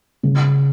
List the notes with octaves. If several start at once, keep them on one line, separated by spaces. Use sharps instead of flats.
C#3